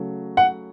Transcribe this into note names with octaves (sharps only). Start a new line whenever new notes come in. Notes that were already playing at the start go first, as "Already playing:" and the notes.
Already playing: C#3 F#3 A3
F#5